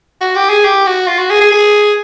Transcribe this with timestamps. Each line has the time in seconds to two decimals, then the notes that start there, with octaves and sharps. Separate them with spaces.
0.21 F#4
0.36 G4
0.49 G#4
0.65 G4
0.86 F#4
1.08 F4
1.18 F#4
1.30 G#4
1.41 G#4
1.51 G#4